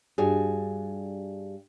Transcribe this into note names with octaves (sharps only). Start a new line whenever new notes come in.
G2 G3 F#4 G#4